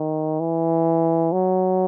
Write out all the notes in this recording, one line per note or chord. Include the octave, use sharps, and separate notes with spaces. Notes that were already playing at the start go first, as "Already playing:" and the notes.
Already playing: D#3
E3
F#3